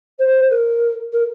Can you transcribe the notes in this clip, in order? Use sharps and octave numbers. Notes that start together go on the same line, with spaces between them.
C5
A#4
A#4